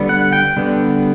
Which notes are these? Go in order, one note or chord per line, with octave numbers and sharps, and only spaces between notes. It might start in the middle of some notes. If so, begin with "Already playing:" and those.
Already playing: D3 G3 B3
F#5
G5
D3 G3 B3